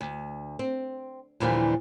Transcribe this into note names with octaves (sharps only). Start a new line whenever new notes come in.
D2
C4
D#2 A#2 D3 E3 F3 G3